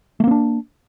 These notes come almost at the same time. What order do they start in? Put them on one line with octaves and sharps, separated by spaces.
A3 A#3 C4 D4